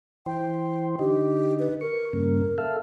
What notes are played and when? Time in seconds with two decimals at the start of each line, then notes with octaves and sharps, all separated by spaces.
0.26 E3 C5 G5
0.99 D3 D#4 G4
1.59 B4
1.81 A#4 C#6
2.13 G2 C#3 A#3
2.58 A4 E5 F5